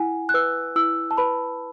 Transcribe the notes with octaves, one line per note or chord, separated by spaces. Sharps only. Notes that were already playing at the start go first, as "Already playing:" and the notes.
Already playing: E4 F#5 G#5
F#6
B4 E6
E4 E6
A5
B4 B5